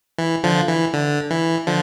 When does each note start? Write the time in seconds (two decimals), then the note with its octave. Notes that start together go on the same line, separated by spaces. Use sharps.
0.18 E3
0.44 D3 F3
0.68 E3
0.94 D3
1.31 E3
1.67 D3 F3